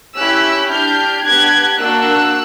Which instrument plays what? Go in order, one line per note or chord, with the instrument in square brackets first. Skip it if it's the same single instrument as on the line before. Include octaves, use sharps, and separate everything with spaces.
[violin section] C#4 E4 G4 E6 F#6
D4 G4 F6 G6
B3 D4 G4 F#6 G#6
A#3 D4 F#4 E6 F#6